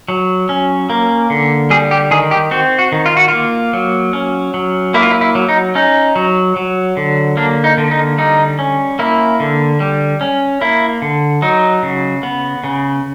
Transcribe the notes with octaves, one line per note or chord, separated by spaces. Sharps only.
F#3
C#4
A#3
D3
G3 G#4
G4
D#3 G#4
G4
C4 F#4
F#4
D#3
F4
F#4
A#3 F4
F#3
C#4
F#3
A#3 E4
F4
E4
E4
F#3
D#4
C#4 D#4
F#3
F#3
D3
A#3 D4
D#4
D3
D#4
G3 D#4
C#4
A#3 E4
D3
G3
C#4
A#3 E4
D3
F#3 D#4
C#3
B3
C#3